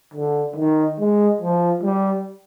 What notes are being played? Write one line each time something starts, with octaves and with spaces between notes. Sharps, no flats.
D3
D#3
G#3
F3
G3